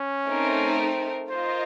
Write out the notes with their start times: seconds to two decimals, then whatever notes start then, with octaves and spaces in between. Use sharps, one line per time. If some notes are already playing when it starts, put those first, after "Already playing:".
Already playing: C#4
0.29 A3 C4 D#4 A#4
1.29 F4 A#4 C5 D#5